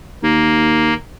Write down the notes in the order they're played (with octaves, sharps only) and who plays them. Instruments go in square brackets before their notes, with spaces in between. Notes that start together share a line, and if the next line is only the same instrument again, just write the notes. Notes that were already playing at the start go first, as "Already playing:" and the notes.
[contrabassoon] D#2 [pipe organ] A#3